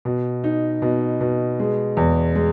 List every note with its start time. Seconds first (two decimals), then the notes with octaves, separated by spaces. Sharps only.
0.05 B2
0.44 D#4
0.82 B2
1.21 B2
1.60 G#3
1.97 E2
2.35 G#3